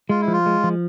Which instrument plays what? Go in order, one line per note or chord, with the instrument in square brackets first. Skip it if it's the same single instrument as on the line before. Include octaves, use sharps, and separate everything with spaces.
[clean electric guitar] G#3 [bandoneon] F4
[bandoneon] E4
[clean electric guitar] F3
[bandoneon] F4
[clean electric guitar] G#3
F3